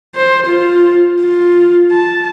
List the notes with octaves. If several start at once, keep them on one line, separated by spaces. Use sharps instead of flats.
C5
F4
F4
A5